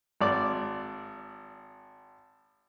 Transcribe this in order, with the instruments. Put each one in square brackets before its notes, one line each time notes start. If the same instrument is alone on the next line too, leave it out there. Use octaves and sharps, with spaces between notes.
[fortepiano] G#1 D5